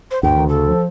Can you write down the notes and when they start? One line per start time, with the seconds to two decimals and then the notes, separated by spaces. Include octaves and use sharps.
0.11 C5
0.23 D2 G2 G5
0.36 D#3
0.49 C#3 A4
0.68 F3